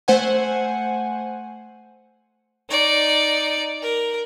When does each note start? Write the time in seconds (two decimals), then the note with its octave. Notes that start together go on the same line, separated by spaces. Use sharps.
0.08 A3 C5 F#5 G#5
2.70 D#4 D5
3.82 A#4